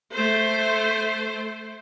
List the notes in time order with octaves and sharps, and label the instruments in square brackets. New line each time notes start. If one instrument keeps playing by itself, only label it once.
[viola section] A3 C5